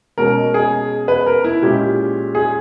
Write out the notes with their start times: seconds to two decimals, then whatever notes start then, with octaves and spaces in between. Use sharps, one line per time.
0.18 B2 G#3 C#4 A#4
0.54 G#4
1.08 B4
1.26 A#4
1.44 E4
1.62 A#2 G#3 C#4 G4
2.35 G#4